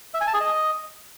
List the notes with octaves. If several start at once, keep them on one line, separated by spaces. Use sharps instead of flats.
E5
G#5
A5
G#4
D#5